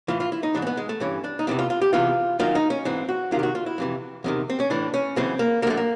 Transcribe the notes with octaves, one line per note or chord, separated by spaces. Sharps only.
A2 E3 F4
F4
E4
D#4
G#2 E3 D4
C4
B3
G#3
A3
G2 E3 C#4
D4
D#4
E2 C3 E3 E4
F4
F4
G4
E2 C3 E3 F4
F#2 D#3 F4
D#4
C#4
G#2 E3 C4
F#4
E2 C3 D#3 F4
G4
F#4
F4
E4
F2 C3 E3
E2 C3 D#3
C4
C#4
A2 E3 D4
C#4
F#2 C#3 E3 C4
A#3
F#2 D3 A3 A#3
A#3